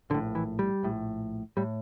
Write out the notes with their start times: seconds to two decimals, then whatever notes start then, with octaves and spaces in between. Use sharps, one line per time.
0.10 A#1 D3
0.14 A2
0.35 E3
0.59 G3
0.83 A#1 A2
1.57 A2 G3